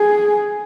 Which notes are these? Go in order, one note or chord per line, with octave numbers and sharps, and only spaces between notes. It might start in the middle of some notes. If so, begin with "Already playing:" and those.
Already playing: G#4